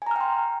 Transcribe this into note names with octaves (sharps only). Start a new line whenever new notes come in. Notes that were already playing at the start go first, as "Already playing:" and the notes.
G5 G#5 A#5 C6 F6